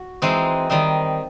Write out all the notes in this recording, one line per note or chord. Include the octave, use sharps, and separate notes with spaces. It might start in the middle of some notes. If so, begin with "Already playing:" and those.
Already playing: F#4
E3 G#3 C4 D#4
D#3 G3 C4 D#4